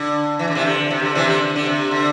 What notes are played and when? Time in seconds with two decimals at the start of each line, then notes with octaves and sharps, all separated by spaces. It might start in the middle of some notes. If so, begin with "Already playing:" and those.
Already playing: D3
0.39 E3
0.48 D3
0.55 C3 E3
0.65 D3
0.90 C3
1.02 D3
1.15 C3 E3
1.28 D3
1.56 D3
1.66 C3
1.91 D3